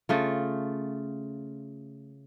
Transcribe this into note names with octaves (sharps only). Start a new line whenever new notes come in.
C#3 A3 F4